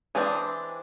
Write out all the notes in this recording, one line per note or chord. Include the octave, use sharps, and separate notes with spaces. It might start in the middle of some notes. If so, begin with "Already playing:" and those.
E3 G#3 C4 D4